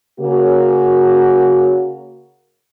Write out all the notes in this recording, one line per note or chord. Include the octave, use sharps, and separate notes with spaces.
C#3 A#3 F#4